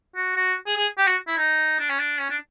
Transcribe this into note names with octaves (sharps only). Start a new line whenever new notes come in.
F#4
F#4
G#4
G#4
G4
F#4
E4
D#4
D4
C#4
D4
C#4
D4